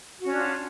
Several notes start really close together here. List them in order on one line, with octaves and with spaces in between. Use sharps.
F#4 C#4 D4 F4